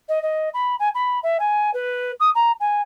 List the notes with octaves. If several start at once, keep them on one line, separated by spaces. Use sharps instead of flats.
D#5
D#5
B5
G#5
B5
E5
G#5
B4
D#6
A#5
G#5